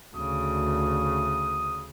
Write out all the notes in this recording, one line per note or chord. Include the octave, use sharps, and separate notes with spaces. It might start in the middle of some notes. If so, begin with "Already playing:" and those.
D2 C#3 D#6